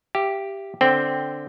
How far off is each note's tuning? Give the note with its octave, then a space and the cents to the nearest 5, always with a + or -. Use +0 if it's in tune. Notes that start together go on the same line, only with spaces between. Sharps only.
G4 +0 E5 +40
D3 +0 C4 +0 G5 +0